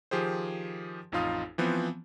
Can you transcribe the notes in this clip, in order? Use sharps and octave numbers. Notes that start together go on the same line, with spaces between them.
D#3 F3 G4 G#4 C5
A1 F2 D#4 F4 F5 D#6
E3 F3 B3 C4